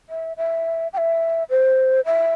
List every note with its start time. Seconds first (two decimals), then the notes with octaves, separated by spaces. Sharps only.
0.09 E5
0.37 E5
0.93 G5
0.98 E5
1.50 C5
2.05 E5